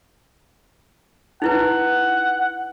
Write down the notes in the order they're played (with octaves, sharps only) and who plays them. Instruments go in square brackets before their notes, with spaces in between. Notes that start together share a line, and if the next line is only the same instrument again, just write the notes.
[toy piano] D#4 E4 B4 [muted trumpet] F#5